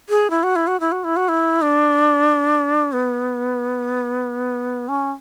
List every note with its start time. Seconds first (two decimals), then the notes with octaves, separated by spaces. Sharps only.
0.09 G#4
0.30 E4
0.43 F#4
0.56 E4
0.67 F#4
0.80 E4
0.92 F#4
1.04 E4
1.16 F#4
1.29 E4
1.62 D4
2.93 B3
4.88 C#4